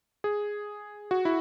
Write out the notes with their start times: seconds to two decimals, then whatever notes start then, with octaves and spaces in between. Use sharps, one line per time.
0.24 G#4
1.11 F#4
1.25 E4